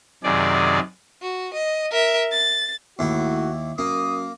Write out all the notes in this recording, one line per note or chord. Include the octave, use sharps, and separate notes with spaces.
F#2 C3 D#3 G#4 D5
F#4
D#5
A#4 E5
A6
D#2 A2 E4 F#4
F#2 A#3 D#6